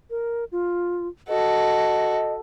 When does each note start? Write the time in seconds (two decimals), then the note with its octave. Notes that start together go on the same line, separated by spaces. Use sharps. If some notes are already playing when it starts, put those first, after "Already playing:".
0.10 A#4
0.52 F4
1.29 F#4 A4 D#5